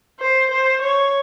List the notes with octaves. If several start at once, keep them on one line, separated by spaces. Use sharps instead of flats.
C5
C5
C#5